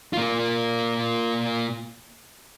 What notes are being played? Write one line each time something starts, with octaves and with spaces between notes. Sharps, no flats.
A#3 F4